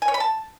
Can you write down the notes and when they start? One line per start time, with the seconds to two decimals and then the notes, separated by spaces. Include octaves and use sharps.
0.02 G#5
0.08 C#5
0.14 B5
0.20 A5